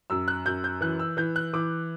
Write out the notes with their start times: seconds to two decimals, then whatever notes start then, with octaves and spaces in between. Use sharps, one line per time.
0.10 F#2 E6
0.28 F#6
0.46 F#2 G6
0.64 G6
0.81 E3 F#6
0.99 E6
1.17 E3 G6
1.36 F#6
1.53 E3 D6